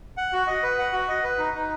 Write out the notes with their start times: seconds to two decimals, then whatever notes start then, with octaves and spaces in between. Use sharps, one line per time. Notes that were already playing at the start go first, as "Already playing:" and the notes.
0.17 F#5
0.33 F#4
0.47 D#5
0.63 B4
0.79 F#5
0.93 F#4
1.08 D#5
1.24 B4
1.38 D#4
1.54 D#4